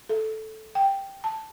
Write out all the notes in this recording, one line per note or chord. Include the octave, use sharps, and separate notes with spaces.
A4
G5
A5